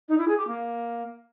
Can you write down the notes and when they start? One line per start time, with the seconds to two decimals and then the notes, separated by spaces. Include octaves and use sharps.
0.08 D#4
0.18 E4
0.28 G#4
0.37 G4
0.47 A#3